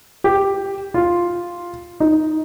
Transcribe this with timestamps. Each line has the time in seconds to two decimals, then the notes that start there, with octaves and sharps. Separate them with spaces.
0.24 G4
0.94 F4
2.00 D#4